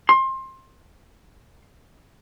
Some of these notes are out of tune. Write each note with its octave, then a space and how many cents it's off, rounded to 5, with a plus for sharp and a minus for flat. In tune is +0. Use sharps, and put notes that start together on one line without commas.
C6 +25